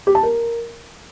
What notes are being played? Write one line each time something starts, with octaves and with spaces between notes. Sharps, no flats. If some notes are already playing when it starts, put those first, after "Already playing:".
G4
A5
A#4